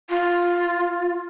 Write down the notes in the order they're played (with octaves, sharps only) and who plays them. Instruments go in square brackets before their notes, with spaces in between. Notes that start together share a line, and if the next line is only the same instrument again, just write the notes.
[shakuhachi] F4